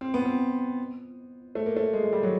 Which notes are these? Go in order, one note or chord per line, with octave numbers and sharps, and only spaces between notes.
C4
B3
C4
A3
A#3
A3
G#3
G#3
G3
F#3